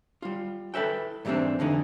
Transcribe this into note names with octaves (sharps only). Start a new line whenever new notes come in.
G3 F4
E4 A4 B4 E5 G5
G#2 E3 G3 A#3 C4 D4
F2 D3 E3 D#4